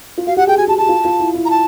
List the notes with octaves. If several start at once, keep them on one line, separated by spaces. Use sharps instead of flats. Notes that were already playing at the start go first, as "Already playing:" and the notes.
F4
F#4 F5
G4 F#5
G#4 G5
F#4 G#5
G4 A5
F#4 A5
F4
F4
E4
E4
A#5
A5